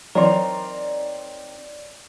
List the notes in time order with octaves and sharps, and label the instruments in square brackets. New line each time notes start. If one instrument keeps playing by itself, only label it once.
[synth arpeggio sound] E3 F#3 [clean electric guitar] C4 D#4 A#4 [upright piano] C#5 D5 C6